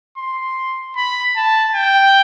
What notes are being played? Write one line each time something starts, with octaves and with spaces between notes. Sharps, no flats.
C6
B5
A5
G5